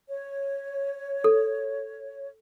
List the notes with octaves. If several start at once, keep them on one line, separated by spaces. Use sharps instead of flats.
C#5
A4